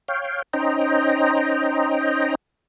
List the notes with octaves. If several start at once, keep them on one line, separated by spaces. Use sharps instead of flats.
C#5 F5 G5
C#4 D#4 C5 D#5 G5 A#5